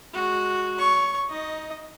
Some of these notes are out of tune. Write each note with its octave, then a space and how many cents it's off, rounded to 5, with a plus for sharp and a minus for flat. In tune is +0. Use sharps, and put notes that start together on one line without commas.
G#3 +0 F#4 -5
C#5 +30 C#6 +0
D#4 +15 D#5 +0